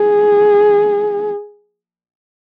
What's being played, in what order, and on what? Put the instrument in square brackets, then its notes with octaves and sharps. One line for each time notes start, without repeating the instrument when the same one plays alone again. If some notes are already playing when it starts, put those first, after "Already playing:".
Already playing: [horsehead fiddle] G#4